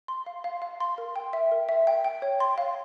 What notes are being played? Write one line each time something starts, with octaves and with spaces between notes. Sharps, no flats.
C6
F5
F5
F5
C6
A#4
G5
E5
A#4
E5
G5
G5
C#5
C6
F5